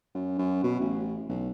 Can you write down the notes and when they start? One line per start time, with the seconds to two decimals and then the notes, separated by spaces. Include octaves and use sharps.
0.15 F#2
0.38 F#2
0.64 B2
0.80 A1
1.29 B1